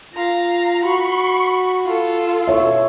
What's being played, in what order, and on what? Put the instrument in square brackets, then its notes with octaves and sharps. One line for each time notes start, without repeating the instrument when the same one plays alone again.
[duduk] F4 [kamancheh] F5 A#5
[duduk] F#4 [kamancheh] B5 C#6
[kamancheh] F4 A4
[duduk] B2 [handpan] E4 C#5 E5